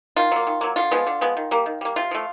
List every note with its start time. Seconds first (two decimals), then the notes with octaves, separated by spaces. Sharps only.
0.16 D#3 F4
0.32 F#3 A#3
0.47 D#3
0.61 F#3 A#3
0.76 D3 F4
0.91 F3 G#3 B3
1.07 D3
1.21 F3 G#3 B3
1.37 D#3
1.51 G3 A#3
1.66 D#3
1.81 G3 A#3
1.96 C3 F4
2.11 F3 A3